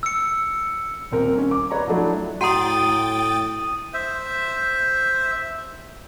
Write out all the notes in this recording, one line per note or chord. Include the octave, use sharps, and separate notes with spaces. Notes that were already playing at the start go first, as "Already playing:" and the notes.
E6 C#7
D#1 C4 A#4
C#4
D6
B4 C#5 D5 A#5
F3 F#3 A3 D4 E4
A2 F#4 F#5 G5 A#5 D#6 A6 D#7
C5 E5